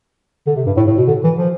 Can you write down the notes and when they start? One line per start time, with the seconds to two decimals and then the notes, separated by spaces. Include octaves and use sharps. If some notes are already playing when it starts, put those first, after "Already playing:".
0.47 D3
0.56 C3
0.66 G2
0.77 A2
0.88 A2
0.97 B2
1.08 D3
1.24 E3
1.38 F3